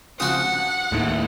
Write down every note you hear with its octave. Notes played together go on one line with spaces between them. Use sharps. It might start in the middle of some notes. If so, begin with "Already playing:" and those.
C#3 F3 C4 F#4 F#5 D#6
G2
D#2 A2 G#3 E4